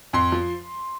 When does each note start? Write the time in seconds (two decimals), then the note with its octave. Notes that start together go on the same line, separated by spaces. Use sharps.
0.13 F2 C6
0.32 F3